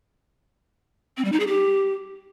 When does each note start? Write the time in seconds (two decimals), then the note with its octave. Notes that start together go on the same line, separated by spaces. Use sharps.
1.17 C4
1.25 G3
1.32 D#4
1.40 G#4
1.47 G4